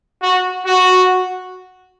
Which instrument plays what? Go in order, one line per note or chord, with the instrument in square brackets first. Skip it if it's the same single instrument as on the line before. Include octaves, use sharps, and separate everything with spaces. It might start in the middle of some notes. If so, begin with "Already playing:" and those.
[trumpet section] F#4
F#4